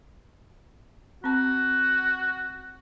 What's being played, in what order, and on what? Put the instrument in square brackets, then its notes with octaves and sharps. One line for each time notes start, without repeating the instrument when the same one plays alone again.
[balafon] C4 A5 [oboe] F#4